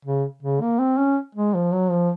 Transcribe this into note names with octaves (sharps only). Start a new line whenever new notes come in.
C#3
C#3
A#3
C4
C#4
G#3
F3
F#3
F3